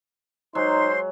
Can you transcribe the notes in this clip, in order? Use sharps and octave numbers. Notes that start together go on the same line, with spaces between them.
F#3 G#3 D#4 C5 C6